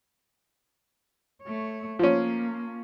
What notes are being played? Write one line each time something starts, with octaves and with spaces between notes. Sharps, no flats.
A3 C#5
F3 A#3 C#4